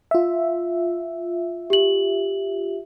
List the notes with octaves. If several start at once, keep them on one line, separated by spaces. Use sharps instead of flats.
F4 E5
G4 F#7